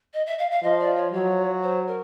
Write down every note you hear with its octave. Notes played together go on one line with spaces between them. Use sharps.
D#5
E5
F5
F5
F3 D#5
D5
C#5
F#3 C#5
C5
A#4